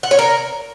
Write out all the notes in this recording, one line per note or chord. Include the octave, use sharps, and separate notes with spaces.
F#5
C#5
A#4